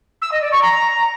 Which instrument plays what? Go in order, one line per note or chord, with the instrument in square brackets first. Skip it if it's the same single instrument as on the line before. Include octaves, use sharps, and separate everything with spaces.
[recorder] E6
D#5
D5
C#6
A#5